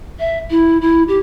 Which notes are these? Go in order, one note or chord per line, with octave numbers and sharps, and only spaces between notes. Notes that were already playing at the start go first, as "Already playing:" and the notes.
E5
E4
E4
G4